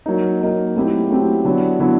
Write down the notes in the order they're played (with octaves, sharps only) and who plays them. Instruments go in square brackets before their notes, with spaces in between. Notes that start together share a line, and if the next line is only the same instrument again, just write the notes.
[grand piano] F#3 A#3 D#4
F#3 A#3 D#4
F#3 A3 C4 E4 G4
F#3 A3 C4 E4 G4
D3 F#3 B3 E4
D3 F#3 B3 E4